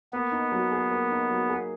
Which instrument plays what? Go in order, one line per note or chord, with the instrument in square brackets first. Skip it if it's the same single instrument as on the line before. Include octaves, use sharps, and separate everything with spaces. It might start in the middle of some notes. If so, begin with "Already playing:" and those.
[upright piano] A#3 [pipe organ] B3
[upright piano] D#4
F#3
G#4
A#3
D#4
F#3
G#4